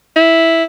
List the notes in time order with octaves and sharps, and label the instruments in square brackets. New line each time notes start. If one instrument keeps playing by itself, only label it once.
[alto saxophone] E4